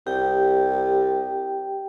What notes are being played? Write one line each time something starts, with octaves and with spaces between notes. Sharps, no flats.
C2 G4 G5